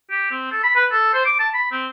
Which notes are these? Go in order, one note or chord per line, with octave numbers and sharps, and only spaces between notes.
G4
C4
A4
B5
B4
A4
C5
D6
A5
B5
C4